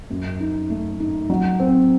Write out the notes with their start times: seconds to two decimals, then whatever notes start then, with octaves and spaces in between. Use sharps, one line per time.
0.10 F#2
0.40 D#4
0.70 A3
1.00 D#4
1.30 F#3
1.60 C4